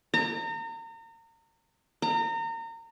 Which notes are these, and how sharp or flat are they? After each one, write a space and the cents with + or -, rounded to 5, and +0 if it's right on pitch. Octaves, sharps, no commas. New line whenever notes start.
A#5 -35
A#5 -30